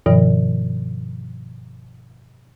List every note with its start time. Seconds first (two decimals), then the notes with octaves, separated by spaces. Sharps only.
0.06 G2 B2 D#3 F3